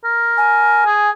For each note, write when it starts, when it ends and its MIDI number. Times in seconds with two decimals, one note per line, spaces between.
0.05 0.83 70
0.37 1.10 80
0.86 1.10 68